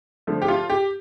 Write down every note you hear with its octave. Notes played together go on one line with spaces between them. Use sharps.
D3 F3 A3
G4
F4
G4